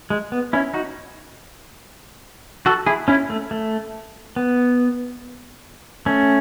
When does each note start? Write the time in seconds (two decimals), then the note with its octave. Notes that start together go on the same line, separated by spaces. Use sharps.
0.10 G#3
0.32 B3
0.53 C#4 E4
0.74 D#4 F#4
2.66 F#4 A4
2.87 E4 G#4
3.08 C#4 E4
3.30 A3
3.51 A3
4.36 B3
6.06 A3 C#4